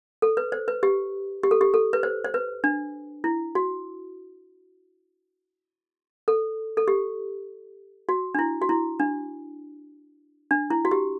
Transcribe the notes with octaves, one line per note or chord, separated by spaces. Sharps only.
A4
B4
C5
B4
G4
G4
A4
G4
A4
B4
C5
C5
B4
D4
E4
F#4
A4
A4
G4
F#4
D4
E4
F#4
E4
D4
D4
E4
F#4
G4